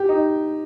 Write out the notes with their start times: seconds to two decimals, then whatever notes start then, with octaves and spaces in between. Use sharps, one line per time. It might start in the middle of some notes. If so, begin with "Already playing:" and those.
Already playing: G4
0.09 D#4